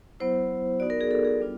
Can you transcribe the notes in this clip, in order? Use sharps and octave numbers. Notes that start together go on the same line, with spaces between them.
F#3 B3 E4 C5
B3 D#4 F#4 D5
A#4
G#4
A4
G#4
G3 B3 D4 F4